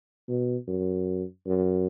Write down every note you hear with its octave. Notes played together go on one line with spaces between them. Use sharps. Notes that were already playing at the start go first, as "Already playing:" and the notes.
B2
F#2
F#2